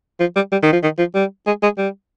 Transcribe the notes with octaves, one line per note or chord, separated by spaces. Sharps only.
F3
G3
G3
D#3
F3
D#3
F3
G3
G#3
G#3
G3